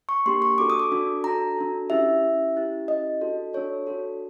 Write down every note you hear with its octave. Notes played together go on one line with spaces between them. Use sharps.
C#6
A#3 D4 G4 C6
C#6
D4 F#4 A4 D6
D#6
D6
D4 F#4 A4
D4 F#4 A4 A#5
D4 F#4 A4
C#4 E4 G4 E5
C#4 E4 G4
C#4 E4 G4
C#4 E4 G4 D#5
D4 F#4 A4
D4 F#4 A4 C#5
D4 F#4 A4